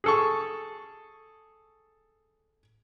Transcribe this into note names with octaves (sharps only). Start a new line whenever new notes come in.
G#4 A4 C#6